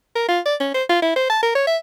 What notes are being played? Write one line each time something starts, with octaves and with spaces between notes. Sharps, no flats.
A#4
F4
D5
C#4
C5
F4
E4
C5
A5
A#4
C#5
E5